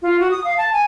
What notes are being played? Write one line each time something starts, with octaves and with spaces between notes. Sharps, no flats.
F4
F#4
D#6
F5
A5
G#5